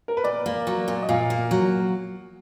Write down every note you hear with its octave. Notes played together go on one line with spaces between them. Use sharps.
A#4
B4
A#2 D5
A#3
F#3
A#2
D#5
A#2 F5
A#3
F#3